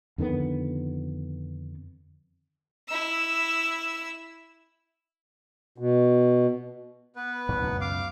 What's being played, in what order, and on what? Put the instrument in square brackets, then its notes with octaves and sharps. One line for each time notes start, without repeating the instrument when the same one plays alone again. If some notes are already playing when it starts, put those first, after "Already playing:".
[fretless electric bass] F2 D3 D#3 B3
[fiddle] E4 E6
[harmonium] B2
[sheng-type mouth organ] B3 B4
[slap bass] A#1 G2 E3
C#2 F#2 B2
[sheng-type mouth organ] F5 D6